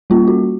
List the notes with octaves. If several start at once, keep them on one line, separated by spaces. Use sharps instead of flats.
G3 A#3 C#4 F4
F#4